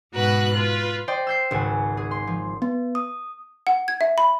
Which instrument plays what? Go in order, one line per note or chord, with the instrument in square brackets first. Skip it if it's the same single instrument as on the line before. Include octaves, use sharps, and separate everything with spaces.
[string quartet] G#2 B2 F#4 B4 F#6
F4 B4
[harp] C5 D5 D#5 G5
E6 G6 C7
G#1 C#2 F#5 G#5
G#4
C6
F3
[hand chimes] B3
D#6
[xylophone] F#5
G#6
E5
B5